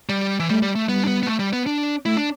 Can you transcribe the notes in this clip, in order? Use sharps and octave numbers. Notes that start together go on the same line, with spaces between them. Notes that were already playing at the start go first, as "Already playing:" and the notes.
G3
E3
G3 A3
G3
A3
G3 B3
D4
B3
B3
A3
G3
B3
D4
A3 E4
D4